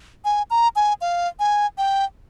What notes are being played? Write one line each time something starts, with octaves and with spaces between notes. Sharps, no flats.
G#5
A#5
G#5
F5
G#5
G5